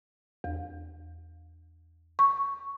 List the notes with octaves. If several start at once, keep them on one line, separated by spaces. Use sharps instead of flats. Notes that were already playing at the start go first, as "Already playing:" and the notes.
E2
C#6